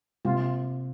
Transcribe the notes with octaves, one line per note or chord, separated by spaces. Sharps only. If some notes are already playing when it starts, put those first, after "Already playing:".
C3 F4